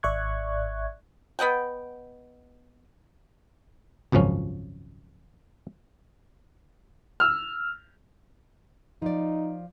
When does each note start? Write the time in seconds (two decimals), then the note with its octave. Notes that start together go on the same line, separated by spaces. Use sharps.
0.03 G#1 D5 E5 C#6 F#6 G#6
1.39 B3 D#5 F#5 G5
4.12 G#1 C#2 F#2 F3 C#4
7.20 E6 F6
9.02 F3 D#4 D5